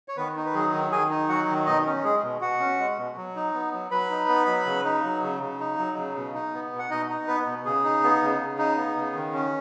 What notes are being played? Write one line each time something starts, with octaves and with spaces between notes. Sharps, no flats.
C#5
D#3 B3 B4
D#4
B4
F#3 G#4
D#3
D#3 G#4 G#5
D#4
F#3 F#4 F#5
D#3
B2 D#4 D#5
C#4
G#3 G#4
B2
B2 F#4 F#5
C#4
G#3
B2
F#3
D#4
B3
F#3
F#3 B4 B5
D#4
B3
F#3
C#3
D#4
F#3
C#3
C#3
D#4
F#3
C#3
B2
D#4
B3
B2
F#5
B2 D#4 D#5
D#4
B3 B4
B2
C#3 G#4
D#4
B3
C#3
C#3
D#4
B3
C#3
D#3
C#4